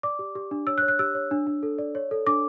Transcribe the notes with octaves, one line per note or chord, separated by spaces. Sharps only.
D5 D6
G4
G4
D4
C#5 E6
F#6
C#5
F#6
G4 E6
C#5
D4
D4
A4
D5
C#5
A4
D4 D6